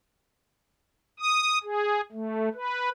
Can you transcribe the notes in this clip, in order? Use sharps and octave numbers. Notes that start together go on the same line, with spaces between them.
D#6
G#4
A3
B4